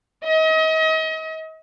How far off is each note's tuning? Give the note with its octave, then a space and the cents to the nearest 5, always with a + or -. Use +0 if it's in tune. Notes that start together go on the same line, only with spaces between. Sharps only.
D#5 +35